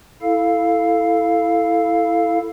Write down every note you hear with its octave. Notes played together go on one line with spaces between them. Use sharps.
E4 A4 F5